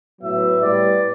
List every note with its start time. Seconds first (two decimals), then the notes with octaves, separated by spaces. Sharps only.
0.21 A2 F#3 B3 E5
0.62 A2 G3 B3 D5